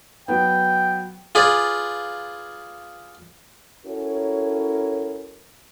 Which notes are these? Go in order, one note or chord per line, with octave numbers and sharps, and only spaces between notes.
F#3 B3 G5
F4 G#4 B4 D5
C#4 E4 F#4 A4 A#4 C#5